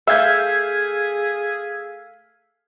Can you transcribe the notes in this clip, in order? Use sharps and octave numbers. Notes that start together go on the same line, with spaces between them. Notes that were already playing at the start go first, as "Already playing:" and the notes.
A3 G#4 E5 F5 E6 G6 G#6 B6